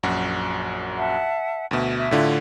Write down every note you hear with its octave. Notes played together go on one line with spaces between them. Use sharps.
A#1 F#2 F#4
E5 F#5 A5
D2 B2 E5
E5
A2 D3 F4